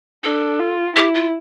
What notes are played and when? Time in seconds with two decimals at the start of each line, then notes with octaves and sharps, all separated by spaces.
0.24 D4 A4
0.59 F4
0.96 E4 G4
1.14 F4